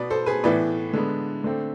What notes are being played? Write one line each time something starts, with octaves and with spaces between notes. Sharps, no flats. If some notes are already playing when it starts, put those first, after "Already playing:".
Already playing: B2 B3 B4 D5
A4 C5
G#4 B4
A2 E3 B3 B4 D5
D3 G#3 B3
D3 A3 C4